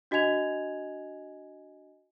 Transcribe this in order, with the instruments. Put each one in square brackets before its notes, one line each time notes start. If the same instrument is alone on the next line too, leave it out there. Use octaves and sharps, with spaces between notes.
[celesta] D4 F#4 D#5 G#5 G#6 F7